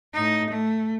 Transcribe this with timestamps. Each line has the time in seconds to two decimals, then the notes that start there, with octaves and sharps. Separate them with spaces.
0.13 A2 D#4
0.50 A3